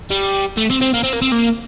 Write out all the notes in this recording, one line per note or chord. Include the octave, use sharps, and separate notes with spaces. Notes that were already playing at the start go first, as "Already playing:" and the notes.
G3
A3
C4
C4
A#3
C4
A#3
C4
A#3